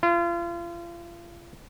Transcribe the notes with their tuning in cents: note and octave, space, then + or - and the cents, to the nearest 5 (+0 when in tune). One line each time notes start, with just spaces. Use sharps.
F4 -35